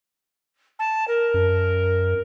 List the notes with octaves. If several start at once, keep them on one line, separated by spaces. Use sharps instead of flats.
A5
A#4
F#2